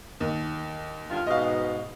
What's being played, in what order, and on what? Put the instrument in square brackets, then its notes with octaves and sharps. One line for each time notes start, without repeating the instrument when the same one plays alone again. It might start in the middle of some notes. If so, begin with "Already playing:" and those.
[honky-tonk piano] D#2
[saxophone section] G2 D3 F4
[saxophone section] G#2 B2 [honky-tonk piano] D#5 F5